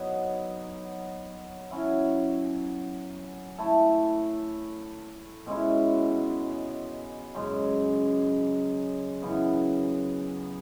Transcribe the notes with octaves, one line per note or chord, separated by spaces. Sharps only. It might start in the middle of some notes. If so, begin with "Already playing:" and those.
Already playing: F#3 B3 D#4
F#3 C#4 E4
A3 E4 A4
B2 G#3 C#4 E4
F#2 C#3 G#3
F#2 C#3 E3 B3